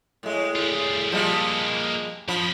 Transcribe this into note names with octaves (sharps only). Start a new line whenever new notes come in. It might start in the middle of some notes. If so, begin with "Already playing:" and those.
A2 G#3
G3 F4
F3 G3 G#3 A#3 A4
F2 F3 B5